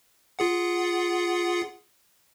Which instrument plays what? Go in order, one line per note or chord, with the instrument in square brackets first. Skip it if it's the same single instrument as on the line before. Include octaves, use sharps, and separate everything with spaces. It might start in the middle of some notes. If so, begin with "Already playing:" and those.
[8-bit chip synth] F4 G#4 F#5